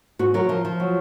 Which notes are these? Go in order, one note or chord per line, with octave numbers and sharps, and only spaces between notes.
G#2 F#4
F#3 A#4
F3
F3
F#3